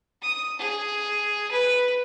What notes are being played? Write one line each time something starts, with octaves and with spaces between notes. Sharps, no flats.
D#6
G#4
B4